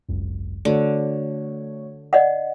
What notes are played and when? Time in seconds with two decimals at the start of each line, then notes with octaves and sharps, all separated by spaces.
0.09 G#1 C#2 F#2
0.65 D3 A3 F#4 C#5
2.13 D5 D#5 F#5